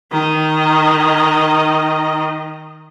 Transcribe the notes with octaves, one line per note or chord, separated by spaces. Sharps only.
D#3 D#5